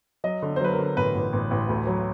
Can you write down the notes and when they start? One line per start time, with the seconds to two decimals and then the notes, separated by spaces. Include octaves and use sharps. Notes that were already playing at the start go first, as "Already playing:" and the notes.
0.24 F#3 D#5
0.42 D3
0.56 C5
0.61 F#3 B4
0.73 A#4
0.79 D3
0.97 A1 B4
1.15 A1
1.33 A1
1.51 A1
1.69 D2
1.87 F#3